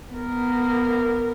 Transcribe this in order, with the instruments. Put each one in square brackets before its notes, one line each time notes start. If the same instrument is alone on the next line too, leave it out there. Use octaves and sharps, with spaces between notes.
[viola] B3 A#4